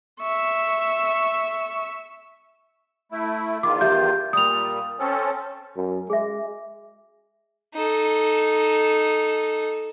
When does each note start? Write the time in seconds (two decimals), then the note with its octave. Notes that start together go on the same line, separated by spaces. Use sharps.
0.21 E5 C#6
3.12 A3 E4
3.63 E2 D#3 F4 D6
3.81 G4 E5 G6
4.33 A#2 G3 D#6 F7
4.99 C4 C#4 A4
5.76 F#2
6.10 G#3 G#4 E5
7.74 D#4 A4